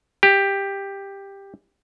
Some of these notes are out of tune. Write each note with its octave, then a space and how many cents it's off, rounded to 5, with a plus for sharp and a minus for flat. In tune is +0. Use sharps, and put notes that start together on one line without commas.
G4 +10